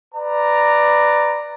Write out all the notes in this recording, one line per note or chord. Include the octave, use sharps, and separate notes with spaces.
B4 D5 A#5